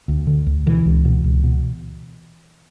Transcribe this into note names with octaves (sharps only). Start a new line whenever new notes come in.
D2
D3
D2
B2 E3
C#2
B2
C#2
B2